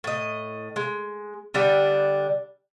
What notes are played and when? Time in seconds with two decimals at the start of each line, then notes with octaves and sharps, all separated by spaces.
0.04 A2 D#5
0.76 G#3
1.54 D3 G3 D4